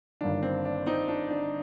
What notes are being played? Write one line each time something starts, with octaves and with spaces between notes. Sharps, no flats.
G1 G2 D#3 A#3 D4
C4
D4
C4 D#4
D4
D4